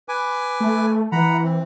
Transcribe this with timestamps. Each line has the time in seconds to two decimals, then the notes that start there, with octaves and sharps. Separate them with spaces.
0.09 B4 G#5 D6
0.60 A3
1.12 E3 F#5 A#5 B5
1.44 C4